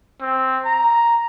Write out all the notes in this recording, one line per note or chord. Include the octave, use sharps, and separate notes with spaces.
C4
A#5